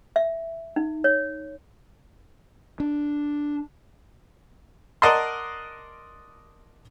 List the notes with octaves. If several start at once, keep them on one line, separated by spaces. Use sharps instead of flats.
E5
D#4
C#5
D4
A#4 D5 D#5 F#5 A5 C6